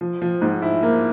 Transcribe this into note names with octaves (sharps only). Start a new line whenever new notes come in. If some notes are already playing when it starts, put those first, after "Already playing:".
F3
F3
G#2
E4
A#3